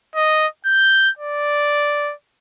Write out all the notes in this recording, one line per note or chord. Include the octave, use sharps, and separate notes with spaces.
D#5
G6
D5